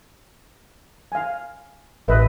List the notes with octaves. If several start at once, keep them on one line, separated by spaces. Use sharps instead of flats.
F5 G#5
A1 B4 D#5 E5